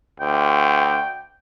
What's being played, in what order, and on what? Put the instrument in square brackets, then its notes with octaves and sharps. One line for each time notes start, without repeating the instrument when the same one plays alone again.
[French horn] D2 [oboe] G5